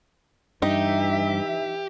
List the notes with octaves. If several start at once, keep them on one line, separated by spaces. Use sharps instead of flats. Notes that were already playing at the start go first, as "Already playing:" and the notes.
G2 E3 D#4 G4 E5